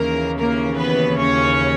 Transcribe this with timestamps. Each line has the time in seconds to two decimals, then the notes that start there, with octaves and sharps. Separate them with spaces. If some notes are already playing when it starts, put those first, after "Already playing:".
Already playing: D#2 C#3 E3 A#3 A#4
0.38 A#3 A#4
0.77 B3 B4
1.18 C#4 C#5